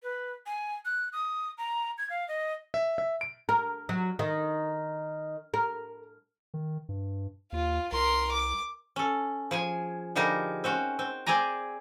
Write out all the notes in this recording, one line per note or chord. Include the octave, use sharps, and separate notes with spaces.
B4
G#5
F#6
D#6
A#5
G#6
F5
D#5
E5
E5
D7
A#4
F#3
D#3
A#4
D#3
G2
D#2 F4
C2 A#4 C6
D6
C#4 A4
F3 G#4 G#5
D3 F3 G3 D#4 G#4 A#4
C4 C#4 F#4
C4
C4 G#4 D5 G#5 A#5